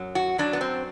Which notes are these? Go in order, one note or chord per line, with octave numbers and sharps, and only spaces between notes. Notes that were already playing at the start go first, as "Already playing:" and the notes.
Already playing: F#2 F#3
F#4
F#2 F#3 D4
B3
C4